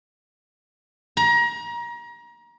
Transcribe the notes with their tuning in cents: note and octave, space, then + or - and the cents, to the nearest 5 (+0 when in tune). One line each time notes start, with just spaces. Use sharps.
A#5 +30